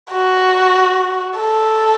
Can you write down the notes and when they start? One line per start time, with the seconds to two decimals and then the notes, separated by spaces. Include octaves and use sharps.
0.11 F#4
1.36 A4